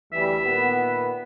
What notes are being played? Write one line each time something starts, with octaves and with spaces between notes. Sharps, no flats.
D2 E3 G3 E5
A#2 D#3 B3